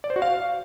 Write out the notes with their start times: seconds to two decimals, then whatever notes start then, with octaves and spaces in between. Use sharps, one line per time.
0.04 D5
0.10 C5
0.16 F#4
0.22 F5